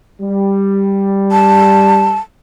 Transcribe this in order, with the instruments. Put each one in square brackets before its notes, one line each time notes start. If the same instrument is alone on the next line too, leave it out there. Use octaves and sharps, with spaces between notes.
[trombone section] G3
[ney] A5